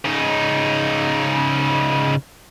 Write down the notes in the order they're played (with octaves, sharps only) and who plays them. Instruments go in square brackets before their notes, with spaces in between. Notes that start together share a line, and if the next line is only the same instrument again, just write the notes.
[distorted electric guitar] C#3 D#4